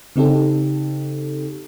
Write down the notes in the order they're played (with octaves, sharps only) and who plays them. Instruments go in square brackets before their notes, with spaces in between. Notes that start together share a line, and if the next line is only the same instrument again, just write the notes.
[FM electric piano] C#3 C4 D#4 G4 A4